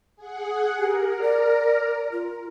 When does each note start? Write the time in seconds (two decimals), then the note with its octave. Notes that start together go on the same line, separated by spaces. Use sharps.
0.16 G#4 F#5
0.79 G4 A#4
1.22 D5
2.12 F4